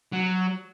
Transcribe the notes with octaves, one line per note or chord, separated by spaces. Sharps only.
F#3